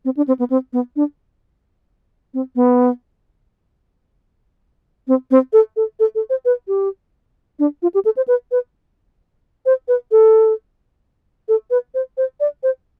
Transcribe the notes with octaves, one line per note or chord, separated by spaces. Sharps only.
C4
D4
C4
B3
C4
B3
D4
C4
B3
C4
C4
A4
A4
A4
A4
C5
B4
G4
D4
F4
G4
A4
C5
B4
B4
C5
B4
A4
A4
B4
C5
C5
D5
C5